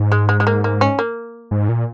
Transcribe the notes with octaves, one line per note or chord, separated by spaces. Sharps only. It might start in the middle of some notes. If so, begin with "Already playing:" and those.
Already playing: G#2
G#3
G#3
G#3
A#3
A#3
C#4
A#3
G#2
A#2